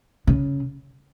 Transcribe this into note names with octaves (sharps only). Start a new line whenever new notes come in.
C#3